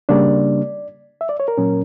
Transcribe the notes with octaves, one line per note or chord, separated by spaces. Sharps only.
C#3 G3 A#3 D4 D5
E5
D5
C#5
A#4
A#2 F#3 C#4